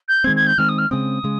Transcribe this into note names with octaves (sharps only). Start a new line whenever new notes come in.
G6
D#3 G#3 C4 G#6
G#6
G6
D#3 G#3 C4 F6
D#6
F6
C#3 G#3 C4 D#6
C#3 G#3